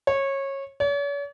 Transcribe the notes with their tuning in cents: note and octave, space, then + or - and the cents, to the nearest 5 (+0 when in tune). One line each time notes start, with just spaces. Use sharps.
C#5 -20
C#5 +45